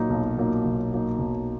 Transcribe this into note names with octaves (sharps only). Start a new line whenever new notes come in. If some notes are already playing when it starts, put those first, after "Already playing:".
Already playing: A#2 F#3 A#3 D#4
B1
A#2 F#3 A#3 D#4
B1
A#2 F#3 A#3 D#4
B1